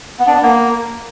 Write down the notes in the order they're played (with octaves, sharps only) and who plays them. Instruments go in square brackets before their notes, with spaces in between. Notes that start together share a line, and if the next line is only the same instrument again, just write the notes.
[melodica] B3
D4
B3
A#3